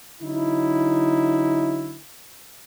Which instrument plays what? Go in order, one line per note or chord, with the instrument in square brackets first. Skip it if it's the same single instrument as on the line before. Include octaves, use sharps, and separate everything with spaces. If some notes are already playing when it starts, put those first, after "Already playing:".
[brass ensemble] D3 F#3 D#4 E4